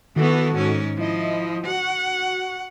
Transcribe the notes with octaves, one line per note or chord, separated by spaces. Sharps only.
D#3 E3 B3 F#4 A4
G#2 C#4
F3 E4 D#5
F#4 F#5